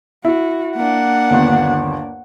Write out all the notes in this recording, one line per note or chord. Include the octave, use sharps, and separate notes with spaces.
E4 F#4
A#3 D4 F#5
G1 D#2